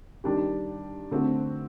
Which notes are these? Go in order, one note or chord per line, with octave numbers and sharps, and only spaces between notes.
D#3 G3 D4 G4
D3 A3 C4 F#4